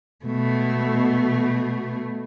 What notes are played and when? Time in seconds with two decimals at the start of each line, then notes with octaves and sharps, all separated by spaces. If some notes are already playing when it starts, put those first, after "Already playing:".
0.25 B2 A3